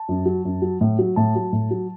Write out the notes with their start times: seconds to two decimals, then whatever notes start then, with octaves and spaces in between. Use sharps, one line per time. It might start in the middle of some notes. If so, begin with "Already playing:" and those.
Already playing: A5
0.09 F#2
0.26 F#3
0.45 F#2
0.62 F#3
0.81 A2
0.99 F#3
1.16 A2 A5
1.35 F#3
1.53 A2
1.71 F#3